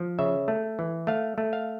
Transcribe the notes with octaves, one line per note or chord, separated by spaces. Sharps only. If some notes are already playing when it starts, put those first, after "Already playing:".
Already playing: F3
C#3 E5
A3
E3
A3 F5
A3
F5